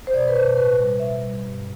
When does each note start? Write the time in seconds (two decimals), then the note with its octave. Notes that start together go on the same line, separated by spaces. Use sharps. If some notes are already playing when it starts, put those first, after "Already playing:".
0.07 C5
0.14 B2 D5
0.28 B4
0.36 B2 C5
0.57 A2 B4
0.78 G3
1.00 B2 E5
1.21 G3
1.43 G2